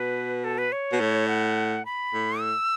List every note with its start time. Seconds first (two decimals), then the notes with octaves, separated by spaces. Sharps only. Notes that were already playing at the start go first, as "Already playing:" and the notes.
Already playing: B2 B4
0.44 A4
0.58 B4
0.72 C#5
0.92 B2
1.00 A2
1.28 F#5
1.85 B5
2.13 A2
2.40 E6